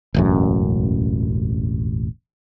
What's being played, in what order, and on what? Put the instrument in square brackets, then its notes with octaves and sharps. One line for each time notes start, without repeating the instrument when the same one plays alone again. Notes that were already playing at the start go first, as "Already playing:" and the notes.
[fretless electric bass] E1 A1 F#2